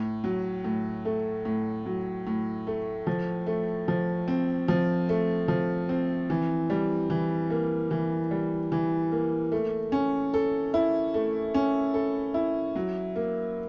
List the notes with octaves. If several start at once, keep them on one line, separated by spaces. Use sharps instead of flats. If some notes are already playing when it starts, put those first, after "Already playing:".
Already playing: A2
F#3
A2
A3
A2
F#3
A2
A3
F3
A3
F3
C4
F3
A3
F3
C4
E3
G3
E3
A#3
E3
G3
E3
A#3
A3
C#4
A4
E4
A3
C#4
A4
E4
F#3
A#3